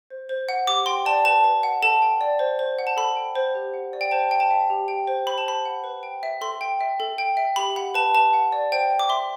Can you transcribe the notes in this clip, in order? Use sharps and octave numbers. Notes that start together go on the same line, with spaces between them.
C5
C5
F#5
G4 D6
G5 C6
D5 A5
B4 A5
B4
F#5
A4 A5
G5
D5
C5
C5
F#5
A5
A4 B5
G5
C5
G4
F#5
D5
G5
C5 A5
G5
A5
E5
G4
G5
C5
C5 B5
A5
C5 B5
F#5
B4
G5
E5
A4 C6
G5
E5
A4
G5
E5
G4 B5
F#5 B5
B4 A5
B4 A5
F#5
D5
C5 G5
G5
D6
E5 C6